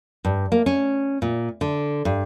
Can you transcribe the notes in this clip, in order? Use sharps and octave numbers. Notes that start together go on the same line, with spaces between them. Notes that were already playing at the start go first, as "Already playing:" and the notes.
G2
A#3
C#4
A#2
D3
G2